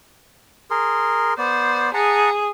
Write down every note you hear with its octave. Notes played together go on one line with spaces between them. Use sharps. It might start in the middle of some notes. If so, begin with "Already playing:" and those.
G#4 A#4 C6
B3 C5 D5
G#4 F#5 A5 A#5